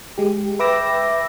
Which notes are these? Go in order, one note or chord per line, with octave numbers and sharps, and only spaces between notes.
G#3 G4
B4 E5 G5 D6 E6 A#6